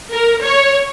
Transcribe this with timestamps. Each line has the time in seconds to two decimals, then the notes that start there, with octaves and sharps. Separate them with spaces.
0.12 A#4
0.43 C#5